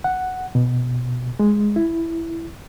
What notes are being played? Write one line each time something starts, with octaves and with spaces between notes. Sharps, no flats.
F#5
B2
G#3
E4